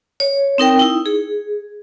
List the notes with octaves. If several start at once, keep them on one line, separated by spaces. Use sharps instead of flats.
C#5
C4 D#4 A#4 G5
D#4 E4
G#4